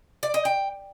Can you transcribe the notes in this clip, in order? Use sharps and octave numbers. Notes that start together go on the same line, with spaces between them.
D5
D#5
G5